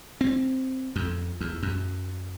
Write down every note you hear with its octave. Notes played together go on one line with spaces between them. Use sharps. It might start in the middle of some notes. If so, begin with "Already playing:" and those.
C4
F2
E2
F#2